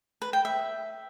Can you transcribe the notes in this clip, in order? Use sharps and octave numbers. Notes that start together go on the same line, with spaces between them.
B4
G5
E5